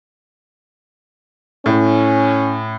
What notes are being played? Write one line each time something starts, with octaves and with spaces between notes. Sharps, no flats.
A2 C#4